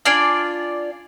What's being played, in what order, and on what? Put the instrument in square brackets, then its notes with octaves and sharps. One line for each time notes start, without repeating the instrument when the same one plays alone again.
[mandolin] D4 F4 D5 G#5